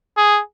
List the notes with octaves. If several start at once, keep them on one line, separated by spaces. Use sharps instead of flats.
G#4